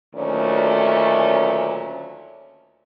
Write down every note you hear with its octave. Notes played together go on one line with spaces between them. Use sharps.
D2 A#2 D#3 F#3 A3 C#4